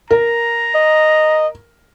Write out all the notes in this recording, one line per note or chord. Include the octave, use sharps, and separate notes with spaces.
A#4 A#5
D#5